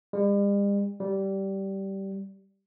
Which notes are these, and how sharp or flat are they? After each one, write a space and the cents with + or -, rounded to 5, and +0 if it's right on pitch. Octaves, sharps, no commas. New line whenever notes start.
G3 +45
G3 -15